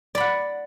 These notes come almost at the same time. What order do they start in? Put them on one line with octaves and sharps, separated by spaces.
D5 B5 F#5